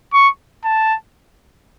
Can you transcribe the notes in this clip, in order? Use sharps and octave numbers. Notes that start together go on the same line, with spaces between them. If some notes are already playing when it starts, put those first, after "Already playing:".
C#6
A5